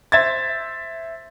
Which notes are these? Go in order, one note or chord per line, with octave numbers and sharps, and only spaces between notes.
C5 E5 G#6 A6